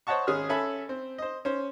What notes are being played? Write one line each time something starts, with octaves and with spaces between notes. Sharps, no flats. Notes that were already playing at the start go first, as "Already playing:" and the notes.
C5 C#5 D#5 F#5 A5 C#6
G#1 C#4 G#4 F6
C#4 A4 E5 G#5 B5
C4
C5 D#5
C#4 C5